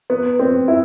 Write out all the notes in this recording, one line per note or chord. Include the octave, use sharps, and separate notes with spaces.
B3
C4
E4